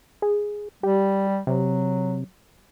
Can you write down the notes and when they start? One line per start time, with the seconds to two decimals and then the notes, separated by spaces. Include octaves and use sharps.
0.22 G#4
0.83 G3 G4
1.47 C3 F#3